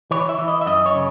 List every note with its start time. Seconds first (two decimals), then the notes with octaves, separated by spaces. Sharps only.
0.11 E3 C#5
0.29 E5
0.38 E3
0.48 D#5
0.61 E5
0.66 F#2 D#5
0.86 C#5
0.95 C#3